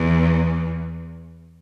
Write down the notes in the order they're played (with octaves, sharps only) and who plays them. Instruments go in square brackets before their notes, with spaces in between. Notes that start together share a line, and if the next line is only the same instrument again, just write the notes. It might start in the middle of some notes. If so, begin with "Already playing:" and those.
Already playing: [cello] E2